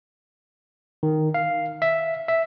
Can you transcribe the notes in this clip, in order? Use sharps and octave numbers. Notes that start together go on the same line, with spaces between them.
D#3
F5
E5
E5